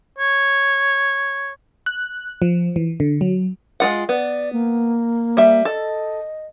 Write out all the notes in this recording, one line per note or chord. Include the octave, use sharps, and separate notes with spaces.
C#5
F#6
F3
E3
D3
F#3
G#3 F4 F#5
B3 D5
A#3
G3 E5
A4 D#5